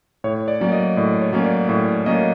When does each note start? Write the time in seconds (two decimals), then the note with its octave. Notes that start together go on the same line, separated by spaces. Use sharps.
0.24 A2 C#5
0.48 D5
0.60 F#3 A#3 C#4
0.72 D#5
0.97 A2 D5
1.21 C#5
1.33 F#3 A#3 C#4
1.44 D5
1.69 A2 D5
2.06 F#3 A#3 C#4 D#5